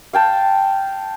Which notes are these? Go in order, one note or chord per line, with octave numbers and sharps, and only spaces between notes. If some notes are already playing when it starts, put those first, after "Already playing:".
F5 G5 A5